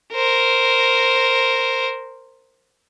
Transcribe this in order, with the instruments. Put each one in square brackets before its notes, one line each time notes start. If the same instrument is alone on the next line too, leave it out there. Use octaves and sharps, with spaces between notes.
[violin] A#4 C5